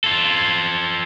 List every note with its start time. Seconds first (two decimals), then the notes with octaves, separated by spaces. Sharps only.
0.04 F4 A4